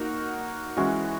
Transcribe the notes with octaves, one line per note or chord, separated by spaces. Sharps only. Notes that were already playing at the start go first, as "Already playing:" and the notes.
Already playing: A#3 D#4 F#4 A#4
E3 G#3 C#4 F#4